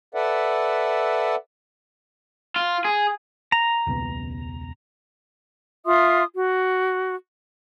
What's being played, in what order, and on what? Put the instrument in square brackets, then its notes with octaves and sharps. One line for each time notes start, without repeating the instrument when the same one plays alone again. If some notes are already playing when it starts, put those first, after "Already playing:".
[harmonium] A4 B4 D5 E5 F#5
[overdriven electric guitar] F4
G#4
[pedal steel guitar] A#5
[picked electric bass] E1 C#2 B2
[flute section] F4 E5 C6 D#6
F#4